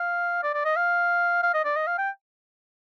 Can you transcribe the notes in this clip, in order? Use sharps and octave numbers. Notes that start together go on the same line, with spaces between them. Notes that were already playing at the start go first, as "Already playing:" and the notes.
Already playing: F5
D5
D5
D#5
F5
F5
D#5
D5
D#5
F5
G5